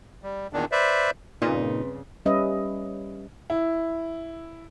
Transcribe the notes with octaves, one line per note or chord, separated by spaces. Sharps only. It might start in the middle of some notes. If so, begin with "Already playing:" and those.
G3
E2 A#2 D#3 D4
B4 C5 D5 E5
G2 A#2 C#3 C4 D#4 B4
G3 C#4 B4 D#5 E5
E4